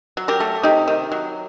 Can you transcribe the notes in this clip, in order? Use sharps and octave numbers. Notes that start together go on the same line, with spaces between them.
F#3
G4 A#4
A3
C3 D#4 G4
D#3
F#3